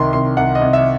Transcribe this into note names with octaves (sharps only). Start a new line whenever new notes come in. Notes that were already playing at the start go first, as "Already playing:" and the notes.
Already playing: C2 D#3 C6
C2 C6
C2 F#5
D#5
C2
E5